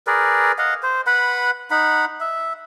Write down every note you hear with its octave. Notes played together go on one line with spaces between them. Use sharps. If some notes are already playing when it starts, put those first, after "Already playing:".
G#4 A#4 B4 D5
D#5 F5 F#5
C5
B4 F#5 B5
D#4 F#5 B5
E5